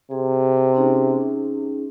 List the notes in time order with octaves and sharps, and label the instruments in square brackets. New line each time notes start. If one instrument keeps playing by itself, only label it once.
[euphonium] C3 [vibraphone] G#4
[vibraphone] C#4 D#4 G#4